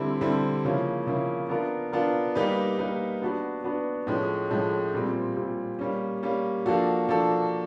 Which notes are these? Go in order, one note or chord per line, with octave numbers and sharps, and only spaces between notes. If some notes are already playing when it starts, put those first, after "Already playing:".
Already playing: D3 G3 C4 E4
D3 G3 C4 E4
C#3 F3 A#3 C#4 E4
C#3 F3 A#3 C#4 E4
B3 D4 F4 A#4
B3 D4 F4 A#4
G3 A#3 D#4 G4 B4
G3 A#3 D#4 G4 B4
B3 D4 F#4 B4
B3 D4 F#4 B4
A2 F3 G#3 C#4
A2 F3 G#3 C#4
A#2 G3 C4
A#2 G3 C4
G3 A#3 C#4
G3 A#3 C#4
F3 A#3 D4 F#4 A4
F3 A#3 D4 F#4 A4